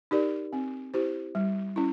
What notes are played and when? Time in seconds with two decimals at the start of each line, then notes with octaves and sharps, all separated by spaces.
0.11 D#4 G4 A#4 D5
0.53 C4
0.94 E4 G4 C5
1.35 G3
1.76 C#4 E4